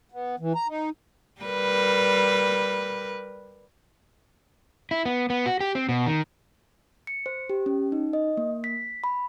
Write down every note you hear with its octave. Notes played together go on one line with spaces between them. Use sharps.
B3
E3
A#5
D#4
G3 A#4 B4
E4
B3
B3
F#4
G4
C4
B2
D#3
C#7
C5
G4
C#4
D#4
D#5
A#3
B6
B5